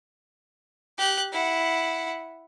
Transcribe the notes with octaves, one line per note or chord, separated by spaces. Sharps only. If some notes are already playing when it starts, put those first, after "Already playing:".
G4 F#6
E4 F#5